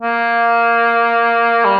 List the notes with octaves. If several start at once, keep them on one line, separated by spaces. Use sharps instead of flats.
A#3
G3